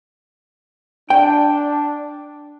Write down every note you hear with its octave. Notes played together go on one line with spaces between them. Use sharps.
D4 G5